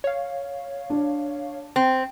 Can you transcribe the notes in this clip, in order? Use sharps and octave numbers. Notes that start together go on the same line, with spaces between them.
C#5 F5
D4
C4